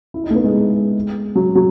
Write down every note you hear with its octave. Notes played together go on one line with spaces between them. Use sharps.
E4
D#4
A3
B3
G#3
F#3
F#3